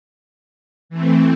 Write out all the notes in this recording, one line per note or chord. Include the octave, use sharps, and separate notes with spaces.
E3 A3 C4